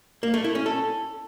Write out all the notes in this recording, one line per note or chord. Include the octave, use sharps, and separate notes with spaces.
A#3
A3
E4
C#4
A4